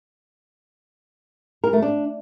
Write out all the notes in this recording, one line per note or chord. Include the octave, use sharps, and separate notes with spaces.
A#4
A3
D4